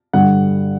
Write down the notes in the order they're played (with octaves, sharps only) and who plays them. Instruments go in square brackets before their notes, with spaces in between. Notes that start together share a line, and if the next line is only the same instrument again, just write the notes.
[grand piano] G2 D3 G3 F#5